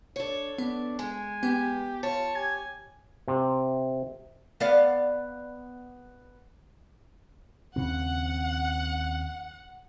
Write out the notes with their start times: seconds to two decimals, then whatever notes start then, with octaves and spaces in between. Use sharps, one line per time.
0.16 D4 A4 C#5
0.58 B3 D4
0.99 G#3 G#5
1.43 B3 G4
2.03 F4 C#5 A5
2.35 G4 G#5 G#6
3.28 C3
4.60 B3 D5 F5
7.76 D#2 C#3 C4 F#5